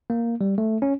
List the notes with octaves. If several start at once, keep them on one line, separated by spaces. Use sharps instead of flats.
A#3
G3
A3
C#4